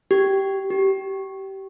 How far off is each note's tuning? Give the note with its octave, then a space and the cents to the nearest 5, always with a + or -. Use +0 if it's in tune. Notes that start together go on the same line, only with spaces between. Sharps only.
G4 -10
G4 -25